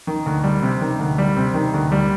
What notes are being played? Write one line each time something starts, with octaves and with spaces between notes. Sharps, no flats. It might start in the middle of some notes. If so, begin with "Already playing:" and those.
D#3
D2
G3
C3
D#3
D2
G3
C3
D#3
D2
G3